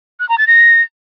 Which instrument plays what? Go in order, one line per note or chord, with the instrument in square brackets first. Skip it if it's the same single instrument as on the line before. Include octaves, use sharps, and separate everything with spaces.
[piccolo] F#6
A#5
A6
A#6